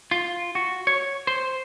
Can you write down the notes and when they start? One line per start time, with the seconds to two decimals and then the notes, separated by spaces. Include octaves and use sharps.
0.11 F4
0.55 F#4
0.87 C#5
1.27 C5